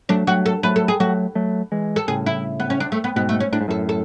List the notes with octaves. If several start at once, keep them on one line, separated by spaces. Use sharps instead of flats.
F#3 A3 D4
F#3 A3 F#4
A4
F#3 A3 B4
A4
G#4
F#3 A3 F#4
F#3 A3
E3 G#3
A4
A2 C#3 G#4
E4
B3
C#4
D4
A3
B3
G#2 B2 B3
A3
C#4
A2 D4
G#2
F#2 A2 A4
A4